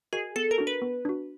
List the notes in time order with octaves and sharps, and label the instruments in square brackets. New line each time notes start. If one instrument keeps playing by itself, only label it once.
[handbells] F#4 A#4 D#5 G#5 [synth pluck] G#4
[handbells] B3 [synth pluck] A4
[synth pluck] A#4
[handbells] D4 F#4
[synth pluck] B4
[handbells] B3
D4 F#4